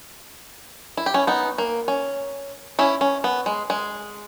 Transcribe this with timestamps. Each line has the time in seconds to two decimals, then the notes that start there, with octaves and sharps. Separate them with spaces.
0.97 E4
1.06 G4
1.14 C#4 E4
1.27 B3 D#4
1.58 A#3
1.88 C#4
2.79 C#4 E4
3.01 C#4
3.24 B3
3.46 G#3
3.70 G#3